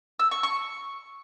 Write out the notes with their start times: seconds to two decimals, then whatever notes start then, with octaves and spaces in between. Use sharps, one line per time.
0.19 E6
0.31 C#6
0.43 C#6